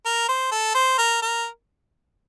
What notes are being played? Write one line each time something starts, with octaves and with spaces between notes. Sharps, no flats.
A#4
C5
A4
C5
A#4
A#4